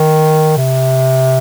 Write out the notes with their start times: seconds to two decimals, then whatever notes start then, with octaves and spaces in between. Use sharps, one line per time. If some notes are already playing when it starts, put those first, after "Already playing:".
Already playing: D#3
0.57 C3